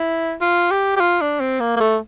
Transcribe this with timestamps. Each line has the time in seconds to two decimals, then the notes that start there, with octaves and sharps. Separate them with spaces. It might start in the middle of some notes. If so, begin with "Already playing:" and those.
Already playing: E4
0.41 F4
0.71 G4
0.96 G4
1.00 F4
1.21 D4
1.41 C4
1.60 A#3
1.76 A#3
1.80 A3